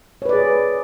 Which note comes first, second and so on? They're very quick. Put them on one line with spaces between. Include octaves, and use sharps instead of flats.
C#5 B4 D5 G#4